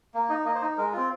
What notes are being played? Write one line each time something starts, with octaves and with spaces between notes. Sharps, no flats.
A#3
D#4 D#5
A#3 D#5
C5
D#4 D#5
G#3 A#4
C4 F4